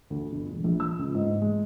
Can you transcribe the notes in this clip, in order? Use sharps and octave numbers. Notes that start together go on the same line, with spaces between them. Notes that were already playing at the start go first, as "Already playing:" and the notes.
D2
G1
E1
A#1
E6
C#2
G#2
G#3